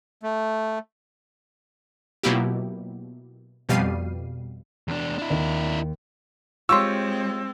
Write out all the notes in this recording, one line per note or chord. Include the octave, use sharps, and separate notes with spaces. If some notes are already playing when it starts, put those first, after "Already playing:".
A3
B2 F#3 A#3 E4 F4 G4
F2 B2 G3 F5 C7 D#7
E2 D4
D4 E4
D#2
G#3 C4 F4 G4 C#5 C6 C#6 E6